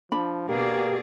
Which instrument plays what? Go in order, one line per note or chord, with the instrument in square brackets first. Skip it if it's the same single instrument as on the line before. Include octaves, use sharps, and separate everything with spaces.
[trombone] F3 [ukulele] D4 B5
[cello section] B2 G#4 D5 [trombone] A#3 [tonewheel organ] G4